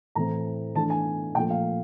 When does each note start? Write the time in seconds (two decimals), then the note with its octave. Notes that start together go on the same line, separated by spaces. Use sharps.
0.15 A2 E3 A3 C4 A#5
0.75 E3 A3 D4 A5
0.90 G#5
1.35 A#2 G5
1.38 F3 A3
1.50 F5